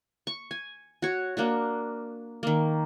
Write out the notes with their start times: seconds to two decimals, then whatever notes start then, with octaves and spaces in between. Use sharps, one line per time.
0.27 C#6
0.51 G#5
1.02 F#4 C#5
1.37 A#3 D4 F#4
2.43 D#3 A#3